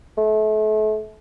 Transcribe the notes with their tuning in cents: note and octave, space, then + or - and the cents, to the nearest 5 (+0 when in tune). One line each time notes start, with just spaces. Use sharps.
A3 -35